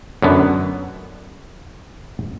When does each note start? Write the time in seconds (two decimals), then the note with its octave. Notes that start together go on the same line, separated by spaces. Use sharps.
0.22 F#2 D3 B3